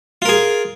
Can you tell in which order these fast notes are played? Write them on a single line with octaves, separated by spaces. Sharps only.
F4 A#4 G#4